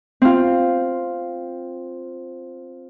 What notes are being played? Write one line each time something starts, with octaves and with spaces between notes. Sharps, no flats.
C4 F4